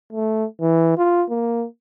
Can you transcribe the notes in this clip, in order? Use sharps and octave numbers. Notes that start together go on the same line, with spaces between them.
A3
E3
F4
A#3